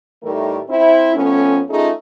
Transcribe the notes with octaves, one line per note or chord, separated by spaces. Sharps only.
A2 D#3 G3 A3 A#4
C4 E4
F2 A3 B3 C#4
A3 C#4 D#4 F4 G#4